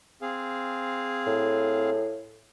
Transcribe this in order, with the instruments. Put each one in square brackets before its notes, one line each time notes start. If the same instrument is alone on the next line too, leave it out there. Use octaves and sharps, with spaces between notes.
[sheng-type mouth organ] C4 G#4 F5
[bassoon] A2